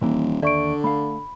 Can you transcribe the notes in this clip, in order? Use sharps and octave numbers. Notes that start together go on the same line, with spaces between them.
D#1 D#3 E3 A#3
D#2 D3 D5 E5 C#6 D7
A3 F5 B5